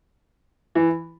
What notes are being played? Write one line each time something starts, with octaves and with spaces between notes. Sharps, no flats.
E3